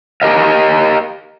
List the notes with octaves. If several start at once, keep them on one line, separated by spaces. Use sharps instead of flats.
G4 A#4 D#5 F5